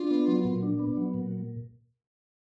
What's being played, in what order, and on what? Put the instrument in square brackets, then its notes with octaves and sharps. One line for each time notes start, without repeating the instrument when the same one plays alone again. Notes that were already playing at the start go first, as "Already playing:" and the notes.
Already playing: [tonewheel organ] D4 [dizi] F4
[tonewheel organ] B3
F#3
A#2
D4
B3
F#3
A#2